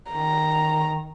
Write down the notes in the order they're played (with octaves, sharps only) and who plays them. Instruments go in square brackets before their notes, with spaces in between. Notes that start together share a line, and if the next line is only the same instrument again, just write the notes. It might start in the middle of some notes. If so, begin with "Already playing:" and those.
[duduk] D#3 [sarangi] A#5